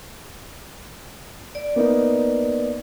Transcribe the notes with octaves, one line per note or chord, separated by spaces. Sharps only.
D5
A#3 B3 D#4